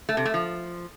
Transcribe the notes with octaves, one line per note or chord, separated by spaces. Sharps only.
A3
C3
A3
F3